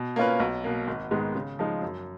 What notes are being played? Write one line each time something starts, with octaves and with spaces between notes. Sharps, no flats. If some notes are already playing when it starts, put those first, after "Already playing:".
Already playing: B2
A#3 C#4 F4 B4
B1
B2 A#3
G#1
G#2 D#3 G#3 B3
C#3
F3 G#3 D#4
F#2